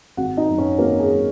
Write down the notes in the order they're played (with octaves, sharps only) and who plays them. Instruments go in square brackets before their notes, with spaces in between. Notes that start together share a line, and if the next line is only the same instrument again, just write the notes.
[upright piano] G#1 F#4 F#5
D#4 D#5
F#2 F#3
C#4 C#5
G#1 A#3 A#4
G#4
F#3